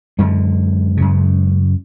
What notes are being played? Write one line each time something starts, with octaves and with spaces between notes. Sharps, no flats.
F#2 D3 G#3
F#2 C#3